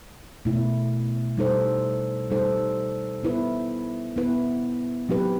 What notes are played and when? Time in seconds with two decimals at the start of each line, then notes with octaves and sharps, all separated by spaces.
0.45 B2 A3 E4
1.37 G3 D#4 A4 C5
2.30 G3 D#4 A4 C5
3.23 B3 E4 B4
4.16 B3 E4 B4
5.09 F#3 C4 D#4 G4 B4